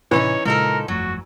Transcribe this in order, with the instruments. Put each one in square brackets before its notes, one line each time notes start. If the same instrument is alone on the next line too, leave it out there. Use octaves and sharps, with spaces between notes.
[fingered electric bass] A2 C3 [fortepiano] E3 [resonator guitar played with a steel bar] B3 C#4 D#4 [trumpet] C#5
[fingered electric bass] A#2 C#3 G#3 [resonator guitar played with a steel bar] F3 D#4 A4 [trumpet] A#4
[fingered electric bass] G1 F2 A3 [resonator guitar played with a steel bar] F#3 [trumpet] F#4